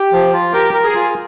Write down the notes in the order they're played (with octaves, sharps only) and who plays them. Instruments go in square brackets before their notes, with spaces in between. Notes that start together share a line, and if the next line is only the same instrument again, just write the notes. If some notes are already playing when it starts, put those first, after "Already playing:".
Already playing: [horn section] G4
[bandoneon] F3
F4
[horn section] G4 [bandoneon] A#4
[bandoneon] A#4
[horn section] G#4
[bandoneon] F4